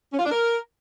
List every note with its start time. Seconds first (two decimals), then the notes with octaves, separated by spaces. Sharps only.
0.12 C#4
0.19 F4
0.25 D4
0.32 A#4